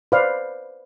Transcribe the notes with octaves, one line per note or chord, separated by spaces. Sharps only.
B4 C5 D5 F5